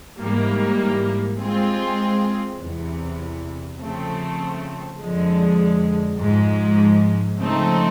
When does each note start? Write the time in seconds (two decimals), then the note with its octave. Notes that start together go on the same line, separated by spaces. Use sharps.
0.19 G#2 E3 G3 A#3
1.39 G#3 C4 F4 G#4
2.59 E2 C3 E3
3.79 C#3 F3 A3 C4
4.99 F2 D3 F3 G#3
6.19 G#2 F3 G#3
7.39 C#3 F3 A3 C4 D#4